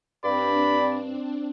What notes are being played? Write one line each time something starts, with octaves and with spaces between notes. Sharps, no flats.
G2 C4 D4 D5 B5